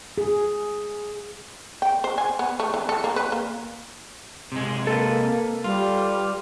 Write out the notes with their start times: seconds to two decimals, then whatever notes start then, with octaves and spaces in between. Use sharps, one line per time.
0.18 G#4
1.82 G5
2.04 C5
2.18 G#5
2.39 B3
2.60 A3
2.74 E3
2.89 A4
3.04 A#3
3.16 B4
3.32 A#3
4.52 C3 G#3
4.87 A#3 A4 B4
5.64 G3 F4